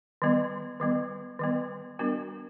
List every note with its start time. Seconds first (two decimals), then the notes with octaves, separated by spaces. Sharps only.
0.22 D#3 G3 B3
0.80 D#3 G3 B3
1.39 D#3 G3 B3
1.99 G3 B3 D4 F#4 A#4